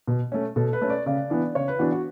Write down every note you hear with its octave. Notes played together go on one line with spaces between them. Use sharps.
B2
A3 C#4
B2 A4
B4
A3 C#4
D5
C#3 D5
E3 B3 D4
C#3 C#5
B4
E3 B3 D4 F#4
F#4